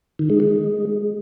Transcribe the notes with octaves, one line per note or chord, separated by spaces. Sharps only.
D#3
G#3
G#3